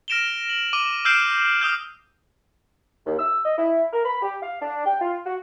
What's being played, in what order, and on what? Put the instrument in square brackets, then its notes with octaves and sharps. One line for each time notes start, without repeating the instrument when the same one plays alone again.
[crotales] F6 A#6 D7 E7 F7 G7
F#7
D6 D#7 G7
E6 F6 G6 C7 D7 E7
D#6 F6 G6
[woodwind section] D#2
E6
D#5
E4
A#4
B5
G4
F5
D4
G5
F4
F#4